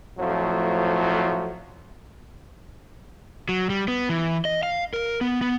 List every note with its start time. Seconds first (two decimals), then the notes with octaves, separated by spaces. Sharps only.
0.19 F2 A2 F3 F#3 A3
3.49 F#3
3.70 G3
3.88 B3
4.09 E3
4.45 D#5
4.63 F5
4.93 A#4
5.21 B3
5.41 B3